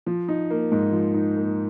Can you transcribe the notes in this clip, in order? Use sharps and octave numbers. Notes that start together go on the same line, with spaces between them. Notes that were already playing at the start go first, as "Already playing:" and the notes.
F3
D#4
A#3
G#2
F3
D#4
A#3